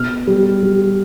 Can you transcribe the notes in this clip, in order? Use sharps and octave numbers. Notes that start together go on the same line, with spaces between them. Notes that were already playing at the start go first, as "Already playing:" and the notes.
Already playing: B2 F6
G3
G3